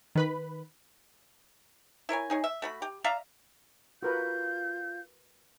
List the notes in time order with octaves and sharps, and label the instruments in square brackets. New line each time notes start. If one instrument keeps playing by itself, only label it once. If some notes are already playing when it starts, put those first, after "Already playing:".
[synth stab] D#3 B4 B5
[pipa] E4 A#4 C#5 G#5
D#4 G#4 C#5
E5
A3 F#4 B5
G4
D5 E5 F5 A#5
[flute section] F4 F5 G6 [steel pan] F#4 A#4 B4